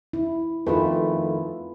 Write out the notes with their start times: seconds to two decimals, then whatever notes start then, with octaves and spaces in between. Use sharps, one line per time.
0.13 E4
0.67 F2 D#3 A3 F4 G#4 B4